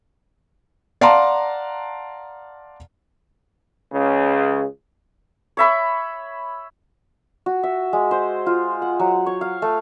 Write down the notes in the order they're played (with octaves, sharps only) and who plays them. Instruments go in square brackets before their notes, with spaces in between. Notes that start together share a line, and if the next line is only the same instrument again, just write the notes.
[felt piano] D5 F5 F#5 A5 A#5 C6
[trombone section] C#2 C#3
[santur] C#5 E5 B5
F#4
E5
G#3
C5
F4
F#5
F#3
C#5
F5
A3